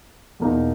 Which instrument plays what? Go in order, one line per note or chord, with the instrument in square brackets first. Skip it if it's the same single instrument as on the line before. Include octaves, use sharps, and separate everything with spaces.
[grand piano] E2 B2 A#3 D#4